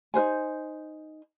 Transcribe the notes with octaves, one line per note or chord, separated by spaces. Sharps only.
D#4 B4 C5 G#5